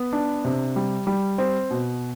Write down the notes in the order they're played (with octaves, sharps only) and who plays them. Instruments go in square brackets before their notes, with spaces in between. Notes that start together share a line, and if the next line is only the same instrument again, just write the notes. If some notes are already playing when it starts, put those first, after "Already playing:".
Already playing: [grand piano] B3
D4
C3
G3
G3
C4
B2